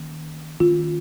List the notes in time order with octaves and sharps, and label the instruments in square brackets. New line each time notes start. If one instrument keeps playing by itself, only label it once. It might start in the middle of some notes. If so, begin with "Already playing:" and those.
Already playing: [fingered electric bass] D#3 A#3 C#4
[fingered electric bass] D#3 A#3 C#4 [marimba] F4